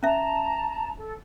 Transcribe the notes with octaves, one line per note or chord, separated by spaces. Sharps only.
C#4 E5 A5 A#5
A4